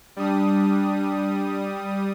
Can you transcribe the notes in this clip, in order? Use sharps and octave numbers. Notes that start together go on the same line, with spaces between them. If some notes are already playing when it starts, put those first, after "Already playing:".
G3 D4 D#6